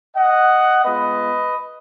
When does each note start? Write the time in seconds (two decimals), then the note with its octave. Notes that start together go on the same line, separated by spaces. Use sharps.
0.17 D#5 F#5
0.84 G#3 B3 F4 B4 D#5